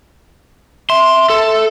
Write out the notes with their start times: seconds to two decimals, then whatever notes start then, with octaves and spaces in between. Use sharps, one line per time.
0.90 E5 C6
1.30 A4